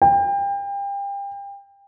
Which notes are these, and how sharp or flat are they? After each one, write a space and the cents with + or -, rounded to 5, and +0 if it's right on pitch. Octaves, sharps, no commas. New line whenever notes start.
G5 +30